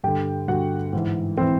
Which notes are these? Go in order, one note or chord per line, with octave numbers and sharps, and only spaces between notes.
G2 D3 G4 G5
G2 D3 F#4 F#5
G#2 E3
C4 C5
E3